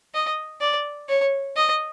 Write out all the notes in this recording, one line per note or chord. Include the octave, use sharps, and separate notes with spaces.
D#5
D5
C#5
D#5